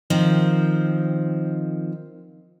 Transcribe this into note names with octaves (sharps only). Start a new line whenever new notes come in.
D#3 F3 C4